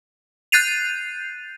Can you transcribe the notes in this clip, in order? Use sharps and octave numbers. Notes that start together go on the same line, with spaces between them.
F#6 G6 A6 C7 D#7 F7